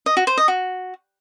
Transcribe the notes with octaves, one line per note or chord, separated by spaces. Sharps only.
D#5
F#4
C5
D#5
F#4